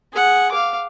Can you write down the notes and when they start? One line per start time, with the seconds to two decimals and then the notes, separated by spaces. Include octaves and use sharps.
0.13 G#4 F#5
0.52 F5 D6